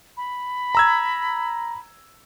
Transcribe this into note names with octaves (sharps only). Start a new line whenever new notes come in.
B5
A#5 E6 G#6